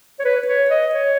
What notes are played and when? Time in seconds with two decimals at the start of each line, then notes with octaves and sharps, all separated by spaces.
0.19 C#5
0.25 B4
0.48 C#5
0.70 D#5
0.94 C#5